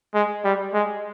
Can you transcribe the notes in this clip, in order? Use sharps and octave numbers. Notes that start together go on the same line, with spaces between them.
G#3
G3
G#3